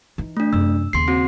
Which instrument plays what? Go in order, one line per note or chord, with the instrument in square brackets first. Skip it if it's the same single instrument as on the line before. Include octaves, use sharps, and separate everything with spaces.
[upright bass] E3 D#4
[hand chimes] A3 D4
[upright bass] F#2 C3 [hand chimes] E6
[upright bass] D#2 C#3 [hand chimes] C6 C7
[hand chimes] C4 F#4